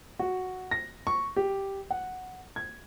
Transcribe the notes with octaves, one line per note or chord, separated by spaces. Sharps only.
F#4
A#6
C#6
G4
F#5
G#6